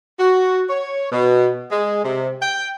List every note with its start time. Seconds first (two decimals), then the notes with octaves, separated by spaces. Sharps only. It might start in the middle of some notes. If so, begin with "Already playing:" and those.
0.19 F#4
0.69 C#5
1.11 B2
1.72 G#3
2.04 C3
2.42 G5